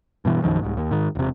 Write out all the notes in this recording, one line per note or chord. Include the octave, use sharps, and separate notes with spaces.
G2 B2 E3
B1 F#2 D#3 F3
C2 G#2
D#2
G#2 D#3
E1 C3